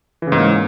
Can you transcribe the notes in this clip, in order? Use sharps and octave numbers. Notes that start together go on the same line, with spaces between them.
G#2 C#3 E3 A#3